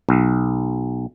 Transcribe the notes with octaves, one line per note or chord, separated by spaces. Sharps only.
B1